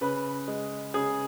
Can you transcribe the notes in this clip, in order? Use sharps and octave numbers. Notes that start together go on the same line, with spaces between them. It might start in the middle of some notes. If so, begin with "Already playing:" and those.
C#3 B4
G#3
C#3 G#4